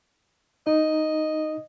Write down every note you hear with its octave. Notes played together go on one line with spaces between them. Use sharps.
D#4 D#5